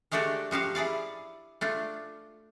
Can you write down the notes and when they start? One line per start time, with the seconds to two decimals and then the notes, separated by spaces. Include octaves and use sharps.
0.12 G#3 A3 D4 F#4 G4 D5
0.51 F3 F#4 G4 F5
0.75 E4 G#4 D5 F5
1.61 A3 D4 F4